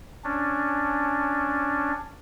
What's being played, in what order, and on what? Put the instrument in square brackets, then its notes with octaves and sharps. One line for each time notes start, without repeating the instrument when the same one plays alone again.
[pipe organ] C#4 D4